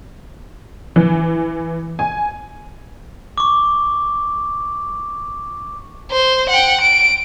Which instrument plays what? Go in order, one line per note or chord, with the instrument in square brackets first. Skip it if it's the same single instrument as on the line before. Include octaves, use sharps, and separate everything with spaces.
[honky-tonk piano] E3
G#5
[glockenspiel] C#6 D6
[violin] C5
F#5 G5
D7